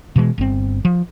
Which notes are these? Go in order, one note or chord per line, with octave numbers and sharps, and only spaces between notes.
B2 E3 F#3 G#3
G1 C4
F3